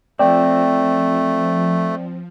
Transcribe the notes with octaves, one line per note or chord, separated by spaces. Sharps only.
F3 A3 C4 D5 G5